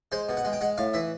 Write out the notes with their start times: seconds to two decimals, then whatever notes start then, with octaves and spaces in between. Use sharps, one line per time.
0.12 G#3 C5
0.29 B2
0.37 F#5
0.45 G#3
0.53 G5
0.61 G#3 F#5
0.78 A2 F5
0.94 E3 E5